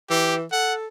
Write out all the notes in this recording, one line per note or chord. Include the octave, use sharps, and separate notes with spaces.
E3 G4
A4 F#5